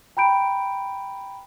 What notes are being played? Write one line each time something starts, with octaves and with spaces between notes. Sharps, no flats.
G5 A#5 B5 G6 D7